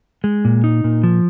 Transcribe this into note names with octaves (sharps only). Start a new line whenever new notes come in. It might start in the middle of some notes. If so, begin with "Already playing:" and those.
G#3
A#2
D#4
A#2
F3